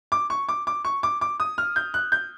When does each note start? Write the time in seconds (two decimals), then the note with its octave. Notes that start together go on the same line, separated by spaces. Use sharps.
0.12 D6
0.30 C#6
0.49 D6
0.67 D6
0.85 C#6
1.03 D6
1.21 D6
1.40 D#6
1.58 F6
1.76 G6
1.94 F#6
2.12 G6